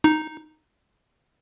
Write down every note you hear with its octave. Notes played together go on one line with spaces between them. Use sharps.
D#4